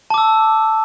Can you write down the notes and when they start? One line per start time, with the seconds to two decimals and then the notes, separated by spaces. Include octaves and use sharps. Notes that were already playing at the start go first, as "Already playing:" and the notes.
0.10 A5
0.14 D6
0.18 E6